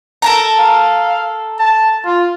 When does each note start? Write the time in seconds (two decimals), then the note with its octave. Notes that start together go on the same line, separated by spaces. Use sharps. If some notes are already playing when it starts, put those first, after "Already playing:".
0.22 A4 A#4 A#5
0.59 F5
1.59 A5
2.06 F4